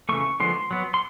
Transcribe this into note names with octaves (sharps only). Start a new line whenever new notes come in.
C#3 E3 A3 C#6
D3 F3 G#3 B3 C6
F#3 B3
C6